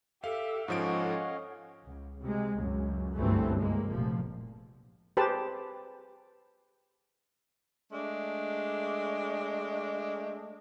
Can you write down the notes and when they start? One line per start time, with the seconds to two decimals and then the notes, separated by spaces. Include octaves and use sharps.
0.24 G4 A4 E5 F5
0.68 G#2 F3 C#4 C#5 D#5 F5 F#5 D7
1.84 C#2
2.20 C3 G#3
2.57 C#2 F#2
3.15 G1 C#2 F#2 E3 A3 C4
3.57 C2 G#3 A#3
3.90 F1 A#2 F3
5.17 G4 G#4 B4 C5 A5
7.92 G#3 A3 D4